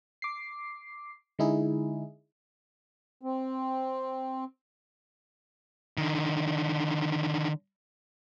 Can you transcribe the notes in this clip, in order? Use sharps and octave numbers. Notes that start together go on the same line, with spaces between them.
D6 C7
D3 G#3 D#4 E4 G#4
C4
D3 D#3